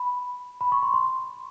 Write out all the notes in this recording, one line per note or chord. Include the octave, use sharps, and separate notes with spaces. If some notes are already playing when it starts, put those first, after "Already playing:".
Already playing: B5
B5
C#6
C6
C6